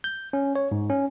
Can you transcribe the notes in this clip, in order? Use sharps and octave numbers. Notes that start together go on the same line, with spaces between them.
G6
C#4
C#5
G#2
C#4